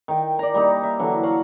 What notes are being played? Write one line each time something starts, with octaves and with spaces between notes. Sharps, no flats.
D#3 G5
D5 A#5
G3 A#3 D#4
E5
D3 E3 F#3
F#4 F5 F#5 C#6